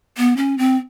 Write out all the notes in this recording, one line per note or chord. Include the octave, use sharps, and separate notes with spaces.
B3
C#4
C4